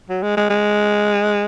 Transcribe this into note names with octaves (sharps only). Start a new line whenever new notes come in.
F#3
G#3
G#3
G#3